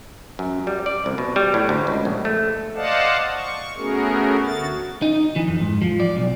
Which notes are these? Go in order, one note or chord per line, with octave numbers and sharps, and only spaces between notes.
F#2
G3
D5
C2
B2
G3
A2
D2
C#2
A#1
A3
C5 D5 D#5 F5 F#5 A5
C#6
A3 B3 C#4 F#4 G#4 A#4
D2 F#4 A6
D#4
E3
F2
G#2
F3
D5
B1